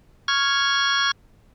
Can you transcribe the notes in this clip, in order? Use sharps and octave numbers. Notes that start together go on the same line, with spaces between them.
C#6 F6 G#6